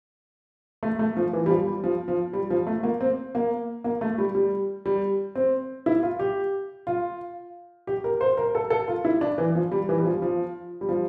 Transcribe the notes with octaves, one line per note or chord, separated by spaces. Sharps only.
A3
A3
F3
E3
G3
F3
G3
F3
F3
G3
F3
A3
A#3
C4
A#3
A#3
A3
G3
G3
G3
C4
E4
F4
G4
F4
G4
A#4
C5
A#4
A4
A4
F4
E4
D4
E3
F3
G3
E3
G3
F3
F3
G3
F3